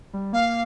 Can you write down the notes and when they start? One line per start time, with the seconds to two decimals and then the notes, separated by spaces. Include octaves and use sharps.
0.13 G3
0.33 A#3 F5